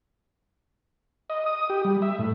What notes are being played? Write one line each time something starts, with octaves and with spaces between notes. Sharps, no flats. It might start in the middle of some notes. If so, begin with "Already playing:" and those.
D#5
D#6
G4
G3
E5
A2